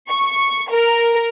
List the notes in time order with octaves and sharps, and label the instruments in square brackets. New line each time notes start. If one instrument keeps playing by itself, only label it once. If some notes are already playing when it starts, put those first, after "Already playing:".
[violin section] C#6
A#4